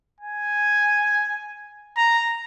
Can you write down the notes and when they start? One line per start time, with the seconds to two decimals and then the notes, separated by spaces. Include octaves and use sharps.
0.21 G#5
1.97 A#5